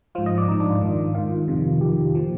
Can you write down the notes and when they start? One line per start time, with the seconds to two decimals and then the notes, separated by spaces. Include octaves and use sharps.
0.15 G#2 F3 F4
0.26 D#5
0.38 D5
0.48 G#2 D#4
0.52 F3
0.60 D4
0.70 F4
0.81 G#2 D#3
1.15 G#2 D#3 F4
1.48 F2 C3 D#3
1.81 F2 C3 D#3 G4
2.15 A#2 F3